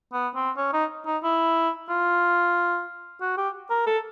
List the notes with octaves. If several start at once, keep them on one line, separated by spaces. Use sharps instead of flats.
B3
C4
C#4
D#4
D#4
E4
F4
F#4
G4
A#4
A4